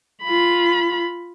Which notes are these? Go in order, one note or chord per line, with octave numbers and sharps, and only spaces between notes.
F4 B5